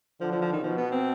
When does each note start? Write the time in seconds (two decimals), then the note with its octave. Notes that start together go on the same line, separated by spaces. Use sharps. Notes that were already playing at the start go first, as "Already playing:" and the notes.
0.21 D3 F3
0.31 F3
0.42 F3
0.53 D#3
0.63 B2 F3
0.77 B3
0.92 C4